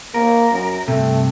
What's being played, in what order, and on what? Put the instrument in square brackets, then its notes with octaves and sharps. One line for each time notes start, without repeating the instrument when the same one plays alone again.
[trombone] A#3 [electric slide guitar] A#4
[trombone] F#2
[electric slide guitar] G2 C3 [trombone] A3